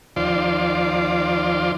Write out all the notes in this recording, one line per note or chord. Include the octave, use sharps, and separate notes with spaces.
D#2 F3 F4 C5 D5